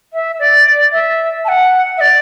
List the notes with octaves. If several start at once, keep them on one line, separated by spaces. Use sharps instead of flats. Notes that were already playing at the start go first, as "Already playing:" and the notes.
E5
D5
E5
A5
F#5
E5
D5